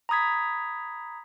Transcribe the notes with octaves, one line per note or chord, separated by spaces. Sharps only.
A#5 B5 D#6 G#6 B6